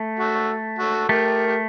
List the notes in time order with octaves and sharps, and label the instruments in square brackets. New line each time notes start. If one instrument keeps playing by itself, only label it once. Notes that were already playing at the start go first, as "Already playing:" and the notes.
Already playing: [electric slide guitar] A3
[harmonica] F#4 A4
F#4 A4
[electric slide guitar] A3 [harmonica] G4 A#4
[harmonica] G4